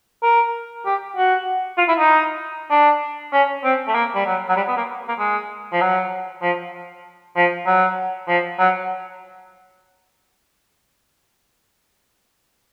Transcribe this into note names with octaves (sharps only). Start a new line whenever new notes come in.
A#4
G4
F#4
F4
E4
D#4
D4
C#4
C4
A3
A#3
G3
F#3
F#3
G3
B3
A#3
A#3
G#3
F3
F#3
F3
F3
F#3
F3
F#3